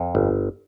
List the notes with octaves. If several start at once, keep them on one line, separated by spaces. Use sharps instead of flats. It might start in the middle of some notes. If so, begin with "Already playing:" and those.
Already playing: F2
G1